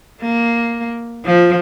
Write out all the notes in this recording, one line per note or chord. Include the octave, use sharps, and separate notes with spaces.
A#3
F3